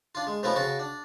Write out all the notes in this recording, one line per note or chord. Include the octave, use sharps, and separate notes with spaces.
D4 F4
G#3
B2 F3 A3 B3 C#4 E4
C#3 F#4 A5
D4